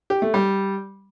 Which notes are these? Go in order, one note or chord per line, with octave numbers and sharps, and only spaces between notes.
G4
A3
G3